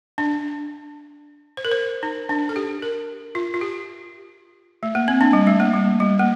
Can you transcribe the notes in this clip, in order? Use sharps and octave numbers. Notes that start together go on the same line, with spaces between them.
D4
C5
A#4
C5
D#4
D4
A4
G4
A#4
F4
F4
G4
A3
A#3
C4
D4
G3
A3
A#3
G3
G3
A#3